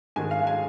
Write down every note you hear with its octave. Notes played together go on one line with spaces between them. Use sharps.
G#2 D#3 G#3 G#5
F5
G#5